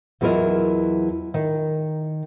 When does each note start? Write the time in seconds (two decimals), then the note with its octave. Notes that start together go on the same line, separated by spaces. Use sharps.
0.21 E2 F#3 E4 F4 A#4 D#5
1.34 D#3